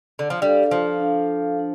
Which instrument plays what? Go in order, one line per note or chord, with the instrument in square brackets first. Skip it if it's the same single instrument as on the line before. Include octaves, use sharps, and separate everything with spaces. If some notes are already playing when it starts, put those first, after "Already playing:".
[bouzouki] D3
F3
[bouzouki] G3 [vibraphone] D4 A4 F5
[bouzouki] F3
[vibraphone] D4 A4 F5
D4